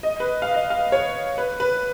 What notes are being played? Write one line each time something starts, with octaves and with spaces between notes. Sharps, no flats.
D#5
B4
F5
D#5
F5
C#5
B4
B4